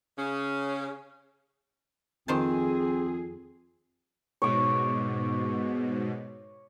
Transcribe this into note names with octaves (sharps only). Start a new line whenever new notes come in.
C#3 C#4
F2 D#3 C4 G#4 C5 A5
G#2 B2 C#5 D6